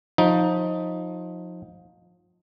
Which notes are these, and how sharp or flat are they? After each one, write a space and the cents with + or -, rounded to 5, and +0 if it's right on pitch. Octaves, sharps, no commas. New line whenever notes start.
F3 +25 D#4 +10